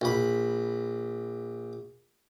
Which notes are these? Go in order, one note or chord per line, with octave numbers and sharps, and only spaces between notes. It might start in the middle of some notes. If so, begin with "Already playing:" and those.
A#1 B5